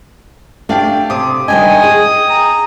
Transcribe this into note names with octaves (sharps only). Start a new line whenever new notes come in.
A3 D4 G4 D5 F5 G5
C3 D6 D#6
D#3 G3 D4 D#5 G5 G#5 D#6
G#4
A#5